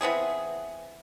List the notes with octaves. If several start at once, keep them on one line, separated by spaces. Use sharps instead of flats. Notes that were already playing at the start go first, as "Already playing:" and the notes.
E3 B3 C4 G#4